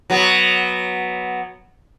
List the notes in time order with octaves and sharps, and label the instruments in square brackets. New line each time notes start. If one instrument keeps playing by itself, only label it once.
[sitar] F#3 B3